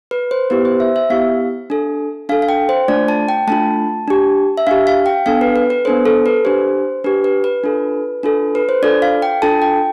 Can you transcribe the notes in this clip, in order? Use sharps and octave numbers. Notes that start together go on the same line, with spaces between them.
B4
C5
B3 E4 G4 B4
C5
E5
E5
B3 E4 G4 F5
D4 A4
D4 A4 F5
F5
G5
C5
A3 D4 F4 D5
A5
G5
A3 D4 F4 A5
D4 G4
E5
D4 G4 F5
F5
G5
B3 D4 A4 F5
B4
B4
B4
B3 D4 A4 C5
A4
B4
D4 G4 C5
D4 G4 B4
B4
B4
D4 F4 A4
D4 F4 A4
B4
C5
D4 F4 A4 D5
F5
G5
D4 F4 A4 A5
G5